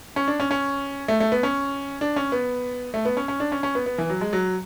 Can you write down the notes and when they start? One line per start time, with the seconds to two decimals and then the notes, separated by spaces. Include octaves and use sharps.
0.16 C#4
0.28 D4
0.40 C#4
0.51 C#4
1.08 A3
1.20 A3
1.32 B3
1.43 C#4
2.01 D4
2.16 C#4
2.32 B3
2.94 A3
3.05 B3
3.17 C#4
3.28 C#4
3.40 D4
3.52 C#4
3.63 C#4
3.75 B3
3.86 B3
3.98 E3
4.10 F#3
4.21 G#3
4.33 F#3